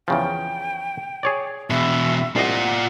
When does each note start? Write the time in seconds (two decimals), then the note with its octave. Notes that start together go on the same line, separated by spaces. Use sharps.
0.08 E2 C#3 F3 G5
1.23 G#4 C#5 D5
1.70 E2 B2 E5
2.36 C2 F4 D5 D#5 F#5